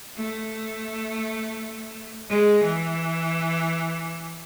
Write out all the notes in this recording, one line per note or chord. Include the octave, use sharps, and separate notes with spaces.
A3
G#3
E3